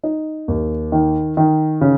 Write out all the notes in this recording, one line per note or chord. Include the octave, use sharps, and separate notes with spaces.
D#4
D#2
D#3
D#3
C#3